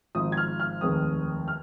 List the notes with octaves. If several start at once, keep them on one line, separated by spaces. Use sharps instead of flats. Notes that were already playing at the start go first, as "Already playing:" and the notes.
G#1 G#2 F3 D#6
G#6
F6
F6
F1 D#2 D#3 G#3 C4 D#6
F6